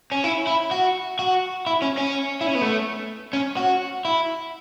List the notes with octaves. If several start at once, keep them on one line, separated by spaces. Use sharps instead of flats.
C#4
E4
E4
F#4
F#4
E4
C#4
C#4
E4
C#4
B3
A3
C#4
F#4
E4